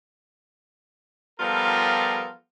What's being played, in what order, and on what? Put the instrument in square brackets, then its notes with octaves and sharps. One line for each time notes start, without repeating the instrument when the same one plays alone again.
[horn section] F3 G3 B3 F4 A4 A#4